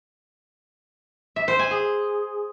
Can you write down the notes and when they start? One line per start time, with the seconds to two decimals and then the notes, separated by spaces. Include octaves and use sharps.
1.36 E5
1.48 C5
1.59 G#5
1.71 G#4